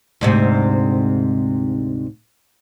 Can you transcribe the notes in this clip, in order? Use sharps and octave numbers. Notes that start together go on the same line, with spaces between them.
D2 G#2 C3